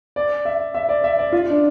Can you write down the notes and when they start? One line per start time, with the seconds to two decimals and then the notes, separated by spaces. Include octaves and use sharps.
0.16 D5
0.45 E5
0.74 E5
0.89 D5
1.04 E5
1.19 D5
1.32 F4
1.50 D4